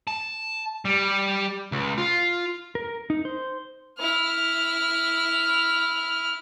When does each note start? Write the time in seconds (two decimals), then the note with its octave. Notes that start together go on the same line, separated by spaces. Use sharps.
0.07 A5
0.85 G3
1.72 C#2
1.98 F4
2.75 A#4
3.10 D#4
3.25 C5
3.99 E4 F6